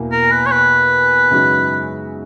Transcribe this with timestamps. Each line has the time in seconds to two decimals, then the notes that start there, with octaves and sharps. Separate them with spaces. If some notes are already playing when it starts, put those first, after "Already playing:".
Already playing: E2 B2 A#3 E4
0.11 A#4
0.31 B4
0.46 C#5
0.52 B4
1.31 F#2 C#3 G#3 D#4 F#4